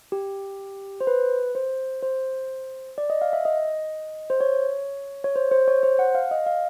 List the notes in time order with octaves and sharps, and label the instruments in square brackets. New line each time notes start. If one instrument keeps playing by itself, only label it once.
[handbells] G4
C5
B4
C5
C5
D5
D#5
F5
E5
D#5
C5
C#5
C#5
C5
C5
C#5
C5
F#5
F5
D#5
F5